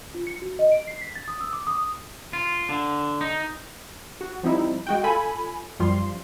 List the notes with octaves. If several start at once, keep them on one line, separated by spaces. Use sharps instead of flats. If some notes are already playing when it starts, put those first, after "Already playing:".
F4
C#7
F#4
D#5
D7
C7
B6
A6
D#6
E6
D6
D#6
F4
D3
D#4
F#4
F3 G3 C4 D#4 E4
G#3 F#4 G5
F4 A4 G#5 B5
F#2 F3 G3 F4 C6